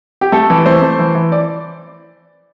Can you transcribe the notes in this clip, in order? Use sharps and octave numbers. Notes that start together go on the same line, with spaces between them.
G4
A3 A4
E3
A3 C5
A3
E3
E3
D5